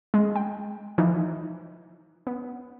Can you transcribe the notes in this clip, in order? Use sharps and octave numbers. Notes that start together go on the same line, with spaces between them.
G#3
G5
E3 F3 D#4
B3